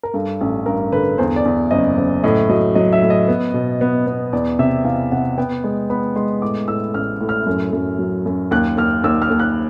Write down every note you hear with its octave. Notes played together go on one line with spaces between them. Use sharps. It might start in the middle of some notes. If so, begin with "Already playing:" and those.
A#4
G2 A4
A1
G2 A#4
D3 B4
E2 C5
D5
E2
F#1 D#5
F#1
A2 D#5
F#3 D#5
F#3 D#5
E5
A2
D#5
B3
B2
B3
B3
E2 D5
C3 E5
E2 F5
C3 F#5
B3 G5
G#3
B3 B5
G#3 C6
A2 D6
A2 E6
A1 F6
A2
F6
F#2
F#2
F#3
F#2
D#2 F#6
D#2 F6
D#2 E6
F6
D#2
F#6